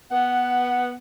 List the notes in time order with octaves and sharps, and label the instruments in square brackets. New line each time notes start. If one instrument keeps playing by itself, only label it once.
[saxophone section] B3 F#5